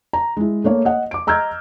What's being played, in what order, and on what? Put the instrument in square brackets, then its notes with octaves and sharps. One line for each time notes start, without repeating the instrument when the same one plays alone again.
[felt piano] A#5
G#3 E4
A3 A#3 C#5
D#5 F#5
D6 D7
D#5 A#5 E6 F6 G6 G#6